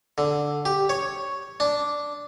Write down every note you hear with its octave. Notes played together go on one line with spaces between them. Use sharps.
D3
G4
C#5
D4